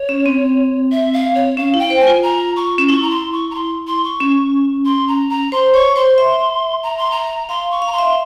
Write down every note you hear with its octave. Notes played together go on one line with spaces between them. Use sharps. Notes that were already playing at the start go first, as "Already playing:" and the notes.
Already playing: C#5
C#4
C4
E5
F5
C#5
C#4 F5
E4
G5
C5
G#5
F4
A#5
C#6
C#4
E4 C#6
A#5
C6
C#6
A#5
C6
C6
C#6
C#4
C6
A#5
A#5
C5 C6
C#5 C#6
C5 C6
E5
A#5
C6
A#5
F5 C6
C#6
F5
A#5
C6
E5